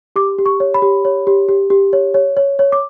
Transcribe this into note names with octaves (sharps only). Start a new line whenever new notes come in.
G4 D6
G4
C#6
C#5
B5
G4
C#5
G4
G4
G4
C#5
C#5
C#5
C#5
D6